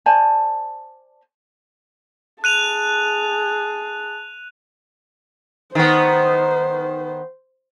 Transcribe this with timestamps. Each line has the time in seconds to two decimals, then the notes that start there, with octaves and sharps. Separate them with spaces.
0.06 C5 D5 G#5 A5
2.44 G#4 A5 F#6 D#7 F7
5.75 D#3 B3 C5